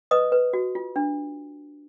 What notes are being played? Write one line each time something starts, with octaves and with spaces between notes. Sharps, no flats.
B4 D#5 D#6
B4
F#4
F4
D4